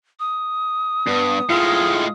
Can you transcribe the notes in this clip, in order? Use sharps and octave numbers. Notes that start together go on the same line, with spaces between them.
D#6
G2 B3
A2 G#3 F4